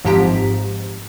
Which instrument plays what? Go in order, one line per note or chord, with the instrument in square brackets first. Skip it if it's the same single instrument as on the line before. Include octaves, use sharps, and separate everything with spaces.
[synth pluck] G#1 G#2 F3 G4 A#5 B6